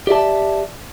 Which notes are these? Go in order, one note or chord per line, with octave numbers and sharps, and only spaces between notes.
G4 D5 E5 A5